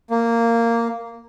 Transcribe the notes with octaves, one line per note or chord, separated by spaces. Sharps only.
A#3